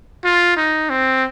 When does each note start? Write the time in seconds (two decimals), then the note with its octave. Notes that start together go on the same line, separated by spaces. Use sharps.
0.25 F4
0.57 D#4
0.90 C4